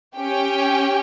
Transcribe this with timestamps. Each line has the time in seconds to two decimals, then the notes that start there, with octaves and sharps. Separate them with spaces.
0.17 C#4 G4 G5